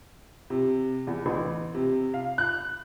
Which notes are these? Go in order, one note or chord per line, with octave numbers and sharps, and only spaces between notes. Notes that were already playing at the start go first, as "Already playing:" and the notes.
C3
E2
A1
C3
F5
F#6